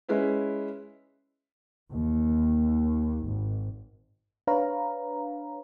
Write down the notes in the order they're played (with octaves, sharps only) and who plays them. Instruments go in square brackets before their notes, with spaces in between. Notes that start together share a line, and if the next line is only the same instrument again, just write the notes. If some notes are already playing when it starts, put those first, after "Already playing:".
[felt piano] G#3 C#4 E4 B4
[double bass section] D#2
G#1
[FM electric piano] D4 B4 C#5 F5 A#5